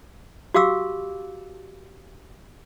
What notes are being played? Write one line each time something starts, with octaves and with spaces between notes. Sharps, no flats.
F#4 G4 F5 D6 E6